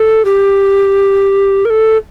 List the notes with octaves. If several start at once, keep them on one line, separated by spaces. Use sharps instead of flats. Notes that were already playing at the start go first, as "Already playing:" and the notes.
Already playing: A4
G4
A#4
A4